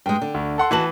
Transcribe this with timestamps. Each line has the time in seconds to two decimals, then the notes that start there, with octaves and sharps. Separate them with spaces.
0.06 G2 G#3 G5
0.22 D3
0.34 D2
0.58 A4 F#5 C6
0.71 D#2 E3 F#4 A5 F#7